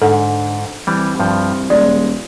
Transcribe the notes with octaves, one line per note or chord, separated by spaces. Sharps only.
G#2 D3 A4 F#5
C2 E3 G3
G2 F3
D#1 G#3 D5